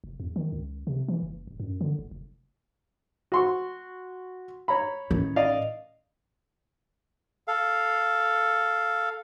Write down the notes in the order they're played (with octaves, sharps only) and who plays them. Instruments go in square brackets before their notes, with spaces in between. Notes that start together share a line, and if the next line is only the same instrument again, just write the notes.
[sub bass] F1
E2
D#3
C#2
C3
E3
F#1
D#1
F#2
D3
F#1
F1
[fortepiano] F#4 C6 C#6
C#5 A#5 B5
[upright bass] A1 D#3
[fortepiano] D5 D#5 F5
[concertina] A4 F5